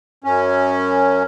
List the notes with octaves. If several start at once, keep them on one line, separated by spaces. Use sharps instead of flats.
F#2 C#4